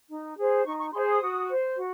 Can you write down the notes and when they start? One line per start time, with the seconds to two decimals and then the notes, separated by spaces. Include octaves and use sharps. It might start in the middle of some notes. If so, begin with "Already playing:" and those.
0.09 D#4
0.37 G#4 C5
0.65 D#4 C#6
0.79 C#6
0.92 G#4 C6
0.97 C5
1.07 D#6
1.21 F#4
1.49 C5
1.76 F#4